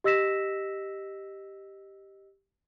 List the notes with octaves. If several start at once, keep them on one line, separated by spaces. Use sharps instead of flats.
G4 D#5 E6 A#6 B6 E7